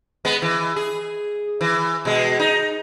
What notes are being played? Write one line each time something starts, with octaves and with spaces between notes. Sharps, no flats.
G#3 B3
E3
G#4
E3
B2 G#3
D#4